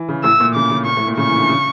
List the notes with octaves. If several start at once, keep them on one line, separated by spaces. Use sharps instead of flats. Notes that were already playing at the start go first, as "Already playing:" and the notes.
Already playing: E3
C#3
A2 E6
A#2
C#3 D6
C#3
A#2 C#6
A2
A#2
C#3 C#6
E3
D3
C#3